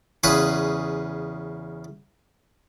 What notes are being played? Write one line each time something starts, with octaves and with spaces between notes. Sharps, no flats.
E2 C#3 G#4 B4 B5 C#6